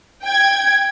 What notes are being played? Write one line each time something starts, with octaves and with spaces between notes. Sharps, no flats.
G5 G#6